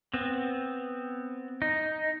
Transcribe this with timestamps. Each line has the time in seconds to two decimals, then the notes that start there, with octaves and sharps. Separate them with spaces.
0.14 B3 C4
1.62 D#4